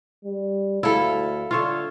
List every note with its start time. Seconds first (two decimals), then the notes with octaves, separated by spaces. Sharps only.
0.25 G3
0.83 D2 E4 A4 F5
1.51 D3 F4 C#5 E5